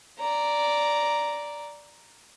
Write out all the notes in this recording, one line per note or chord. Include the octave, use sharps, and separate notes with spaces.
D5 A#5